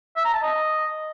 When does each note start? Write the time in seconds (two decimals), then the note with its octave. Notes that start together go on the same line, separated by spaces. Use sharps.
0.16 E5
0.25 A#5
0.33 A5
0.42 D#5